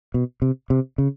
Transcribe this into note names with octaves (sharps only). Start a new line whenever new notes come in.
B2
C3
C3
C#3